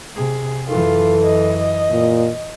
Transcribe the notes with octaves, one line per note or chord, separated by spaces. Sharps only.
C3 G#4
F#2 E3 F4 A4
D#5
A#2